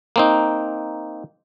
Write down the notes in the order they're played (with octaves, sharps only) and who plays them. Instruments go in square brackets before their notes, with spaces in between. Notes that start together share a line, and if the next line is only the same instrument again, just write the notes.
[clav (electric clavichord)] A#3 C4 D#4